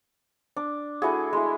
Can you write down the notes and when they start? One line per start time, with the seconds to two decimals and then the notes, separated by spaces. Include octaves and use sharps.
0.56 D4
1.02 A3 E4 F#4 G#4
1.33 G#3 E4